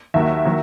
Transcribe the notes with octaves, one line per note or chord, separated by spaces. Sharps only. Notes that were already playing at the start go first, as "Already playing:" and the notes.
D#2 D#3 F#3 E5
D#3 F#3